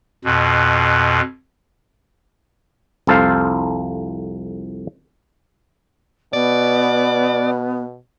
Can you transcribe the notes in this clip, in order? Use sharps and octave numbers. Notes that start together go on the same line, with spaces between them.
F2 B2
C2 F2 A4 C5 F5
B2 B3 D5